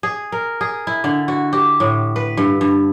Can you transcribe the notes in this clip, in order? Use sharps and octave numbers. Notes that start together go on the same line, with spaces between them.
G#4
A#4
G#4
E4
D3
F#4
G4
A2
B4
G2
G2